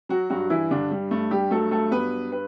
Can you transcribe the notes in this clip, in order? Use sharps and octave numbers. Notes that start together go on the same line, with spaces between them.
F#3 F#4
G2 F#3 F#4
E3 E4
G2 D3 D4
G3
G2 A3
G3 G4
F#3 A3 A4
A3 A4
G2 B3 B4
B4